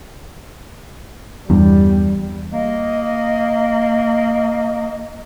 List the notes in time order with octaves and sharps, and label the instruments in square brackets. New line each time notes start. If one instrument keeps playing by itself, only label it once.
[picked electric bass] E2 G2 [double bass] G3
[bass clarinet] A#3 [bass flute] D#5